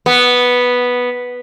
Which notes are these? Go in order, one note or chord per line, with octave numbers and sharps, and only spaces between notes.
B3